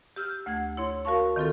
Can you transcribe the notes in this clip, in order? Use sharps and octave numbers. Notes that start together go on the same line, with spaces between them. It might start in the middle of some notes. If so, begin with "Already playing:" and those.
G4 E6 F6 G6
D2 A3 F#5 G#6
E4 C#5 C6
F#4 A#4 F5 A5 C#6
D#3 C4 F4 A4